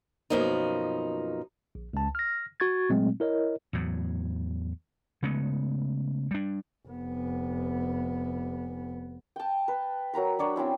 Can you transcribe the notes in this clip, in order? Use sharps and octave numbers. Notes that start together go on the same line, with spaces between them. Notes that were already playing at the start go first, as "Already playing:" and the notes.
F#2 B2 F3 A#3 D#4
A#1
C#2 A5
F6 A#6
F#4 C#6 G#6 A6
A#2 F#3 G#3 A3 C4
E4 A#4 C#5 D#5
E2 A2 F#3
C#3 G#3 A3 B3
G3 D4
F1 B3
G5 A5
B4
F#3 A#4 A#5 B5
F#3 D4 C#5 B5
C4 C#4 E4 C5